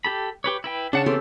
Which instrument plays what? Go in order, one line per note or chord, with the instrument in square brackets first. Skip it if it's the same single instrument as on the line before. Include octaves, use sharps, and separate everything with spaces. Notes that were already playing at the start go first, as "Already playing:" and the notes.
[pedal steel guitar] G4 A4 B5
G4 B4 C#5
E4 B4 G5
[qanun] C#3 [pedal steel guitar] D4 F#5 A5
[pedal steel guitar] E3 B3 C4 [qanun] G4 A4 C6